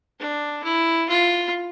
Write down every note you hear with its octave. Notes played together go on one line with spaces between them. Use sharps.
D4
E4
F4